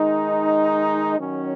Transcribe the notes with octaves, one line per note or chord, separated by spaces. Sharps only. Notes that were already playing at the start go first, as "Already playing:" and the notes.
Already playing: D#3 G#3 D#4
D#3 F#3 C#4